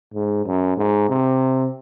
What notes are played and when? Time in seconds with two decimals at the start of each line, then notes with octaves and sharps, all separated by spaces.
0.14 G#2
0.46 F#2
0.77 G#2
1.09 C3